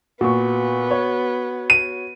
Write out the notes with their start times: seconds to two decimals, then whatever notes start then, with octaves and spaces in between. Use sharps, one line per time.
0.21 A#2 B3 F#4 C#6
0.91 C#5
1.70 D#7